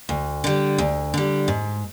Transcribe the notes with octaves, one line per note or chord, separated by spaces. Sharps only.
D2
D3 G3
D2
D3 G3
G#2